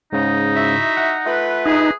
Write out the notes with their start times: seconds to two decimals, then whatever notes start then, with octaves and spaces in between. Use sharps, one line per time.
0.12 G#2 C#3 D#4
0.55 E4 F#4 E5
0.97 F#5
1.26 A3 F4 B4
1.66 D#4 G#4